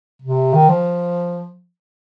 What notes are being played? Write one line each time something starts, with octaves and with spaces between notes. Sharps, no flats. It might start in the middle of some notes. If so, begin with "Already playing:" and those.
C3
D#3
F3